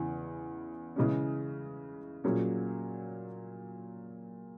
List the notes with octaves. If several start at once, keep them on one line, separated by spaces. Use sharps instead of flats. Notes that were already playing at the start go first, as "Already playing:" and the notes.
Already playing: E2 C#3 E3
C#3 E3 G#3 C#4
A#2 F#3 C#4 G#4